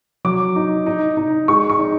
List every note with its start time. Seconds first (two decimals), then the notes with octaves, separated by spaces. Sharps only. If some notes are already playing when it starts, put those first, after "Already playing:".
0.25 F#3 D6
0.56 D#4
0.86 D#4
1.17 D#4
1.48 G#3 C#6
1.70 C#6
1.79 D#4